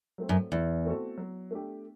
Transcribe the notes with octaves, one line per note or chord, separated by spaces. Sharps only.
F#3 A3 C4
F#2
E2 E3
A3 C4 F#4 A4
F#3
A3 D4 G4